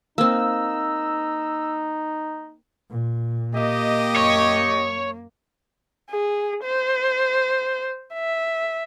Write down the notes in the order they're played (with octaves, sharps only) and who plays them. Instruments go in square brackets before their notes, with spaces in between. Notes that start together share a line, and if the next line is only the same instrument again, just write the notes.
[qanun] A#3 C4 [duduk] D#4 [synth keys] E6
[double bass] A#2
[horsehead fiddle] A#3 [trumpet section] G4 D#5
[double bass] F#2 [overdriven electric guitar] C#5
[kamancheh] G#4
C5
E5